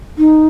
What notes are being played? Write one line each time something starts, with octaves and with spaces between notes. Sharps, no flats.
D#4